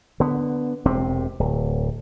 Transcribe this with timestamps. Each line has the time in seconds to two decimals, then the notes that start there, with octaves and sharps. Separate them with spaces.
0.20 D3 B3
0.85 E1 C3 C4
1.40 D1